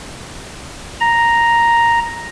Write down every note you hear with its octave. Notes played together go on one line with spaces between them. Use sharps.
A#5